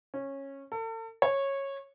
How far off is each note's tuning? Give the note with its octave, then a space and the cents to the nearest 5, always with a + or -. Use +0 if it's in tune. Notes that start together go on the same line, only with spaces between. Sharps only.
C#4 -15
A4 +40
C#5 -15